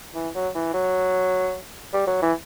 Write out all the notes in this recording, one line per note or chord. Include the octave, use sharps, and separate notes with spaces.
E3
F#3
E3
F#3
G3
F#3
E3